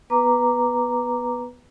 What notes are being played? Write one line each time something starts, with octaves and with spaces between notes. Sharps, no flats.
B3 B4 A#5 D6